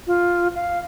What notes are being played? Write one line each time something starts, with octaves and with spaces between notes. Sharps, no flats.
F4
F5